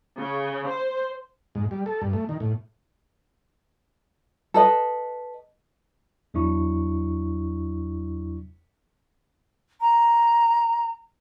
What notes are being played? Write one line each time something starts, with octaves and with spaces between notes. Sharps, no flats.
C#3
C5
G#2
G3
A4
G2
A3
D#3
A2
A4 B4 D#5
E2 F#3 D4 E4 C#6
A#5